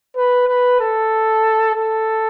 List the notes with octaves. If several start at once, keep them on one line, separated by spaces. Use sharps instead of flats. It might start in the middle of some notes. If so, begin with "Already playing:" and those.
B4
B4
A4
A4